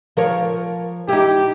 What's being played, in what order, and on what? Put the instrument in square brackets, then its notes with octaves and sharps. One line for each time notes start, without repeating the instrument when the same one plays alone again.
[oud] F3 A#4 C#5
[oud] D#4 E4 [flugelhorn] G4